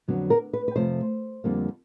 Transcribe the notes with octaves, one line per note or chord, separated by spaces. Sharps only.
F2 D3 F#3 B3
A#4
B4
B4
F2 C3 F3 A3 C5
F2 D3 G3 A#3